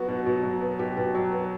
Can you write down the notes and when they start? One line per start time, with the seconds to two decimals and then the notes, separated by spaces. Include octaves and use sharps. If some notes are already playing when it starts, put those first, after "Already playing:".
Already playing: F#3 B3 F#4
0.08 B2
0.26 B2
0.43 F#3
0.61 B3
0.79 B2 G4
0.97 B2
1.15 F#3
1.32 B3